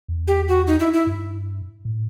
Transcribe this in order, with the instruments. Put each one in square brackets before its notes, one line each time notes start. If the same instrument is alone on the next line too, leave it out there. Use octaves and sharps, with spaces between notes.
[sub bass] E2
[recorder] G4
F#4
D#4
E4
E4
[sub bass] G2
A2